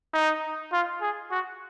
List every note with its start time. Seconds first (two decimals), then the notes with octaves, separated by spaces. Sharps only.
0.14 D#4
0.72 F4
1.01 G#4
1.31 F#4